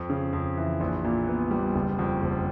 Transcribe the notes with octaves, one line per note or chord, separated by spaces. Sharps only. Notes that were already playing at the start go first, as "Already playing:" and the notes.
Already playing: F2
C#3
F2
E3
A#1
A#2
B3
G3
F#1
F2
F#1